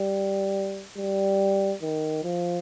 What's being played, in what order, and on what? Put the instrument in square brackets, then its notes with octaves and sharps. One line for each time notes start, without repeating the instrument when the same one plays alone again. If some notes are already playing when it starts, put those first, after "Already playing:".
Already playing: [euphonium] G3
G3
D#3
F3